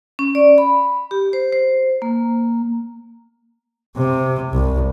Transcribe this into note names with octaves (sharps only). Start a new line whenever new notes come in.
C#4
D5
B5
G4
C5
C5
A#3
C3
C2